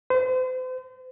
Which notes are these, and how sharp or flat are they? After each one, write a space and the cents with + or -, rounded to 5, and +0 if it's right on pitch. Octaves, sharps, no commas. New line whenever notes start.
C5 -40